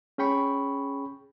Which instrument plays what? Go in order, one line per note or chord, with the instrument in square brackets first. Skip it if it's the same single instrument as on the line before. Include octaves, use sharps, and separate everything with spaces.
[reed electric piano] C#4 G#4 G5 B5 C#6